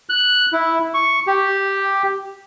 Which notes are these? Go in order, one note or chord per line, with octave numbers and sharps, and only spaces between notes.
F#6
E4
C#6
G4